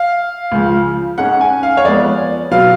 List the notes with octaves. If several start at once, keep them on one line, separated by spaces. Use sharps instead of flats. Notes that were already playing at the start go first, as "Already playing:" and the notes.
Already playing: F5
C#2 C#3 F3
G#2 G#3 C#4 F#5
G#5
F5
C#5
F2 F3 G#3 B3 D5
B2 F#3 F5